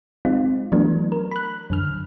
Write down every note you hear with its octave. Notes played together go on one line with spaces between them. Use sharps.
G#3 C4 D#4 F4
E3 F#3 A3 B3 D4
A#4
B5 F#6
F#2 D3 F6